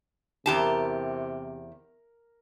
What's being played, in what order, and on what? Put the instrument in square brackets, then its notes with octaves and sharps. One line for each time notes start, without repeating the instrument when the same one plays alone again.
[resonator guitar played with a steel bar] E2 G4 A5 [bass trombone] C3 [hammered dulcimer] A#4